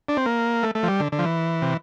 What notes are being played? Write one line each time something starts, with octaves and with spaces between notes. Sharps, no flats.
D4
C4
A#3
A3
A3
F3
G3
D3
D3
F3
E3
C3